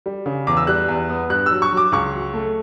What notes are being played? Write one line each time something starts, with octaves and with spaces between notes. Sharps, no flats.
G3
C#3
E2 D6
E6
G3 F#6
E2
B3
G2 F#6
E6
F#3
C#6
F#3
D6
C#2 C#6
F#3
A3